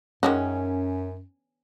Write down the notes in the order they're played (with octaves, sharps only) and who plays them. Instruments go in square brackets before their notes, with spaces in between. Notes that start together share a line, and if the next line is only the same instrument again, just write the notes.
[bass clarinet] F#2 [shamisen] D#3 G#3 F#4 [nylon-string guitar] C#4